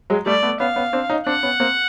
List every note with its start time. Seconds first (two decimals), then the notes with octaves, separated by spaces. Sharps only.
0.10 F#3 G#3
0.26 G3 A3 D5
0.43 A3 B3
0.60 B3 C#4 F5
0.76 B3 C#4
0.93 C4 D4
1.10 C#4 D#4
1.26 C4 D4 F#5
1.43 B3 C#4
1.60 A#3 C4